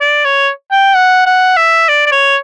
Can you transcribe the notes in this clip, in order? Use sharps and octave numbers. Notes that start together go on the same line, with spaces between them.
D5
C#5
G5
F#5
F#5
E5
D5
D5
C#5